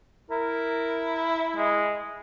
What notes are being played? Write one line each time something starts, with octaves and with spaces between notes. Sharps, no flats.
E4 A#4
G#3